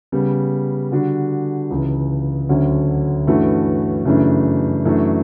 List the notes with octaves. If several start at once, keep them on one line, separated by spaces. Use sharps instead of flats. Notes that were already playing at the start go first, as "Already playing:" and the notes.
C#3 G3 B3
D3 G3 D4 F#4
C#2 C#3 E3
D2 D3 F#3 C#4
G2 E3 A3 C#4 F#4
F#2 C#3 E3 A3 D4
F#2 E3 A3 D4 F#4